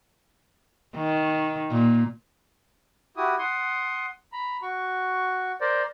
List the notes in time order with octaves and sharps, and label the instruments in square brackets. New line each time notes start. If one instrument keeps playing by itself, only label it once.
[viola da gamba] D#3
A#2
[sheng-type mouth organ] E4 F#4 G4 D#6
F#5 C6 D#6
A#5 B5
F#4 C#6
A#4 C5 D5